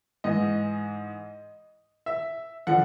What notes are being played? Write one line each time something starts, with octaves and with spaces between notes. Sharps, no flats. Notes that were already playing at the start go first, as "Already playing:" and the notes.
G#2 E3 D#5
E5
D3 F3 F#5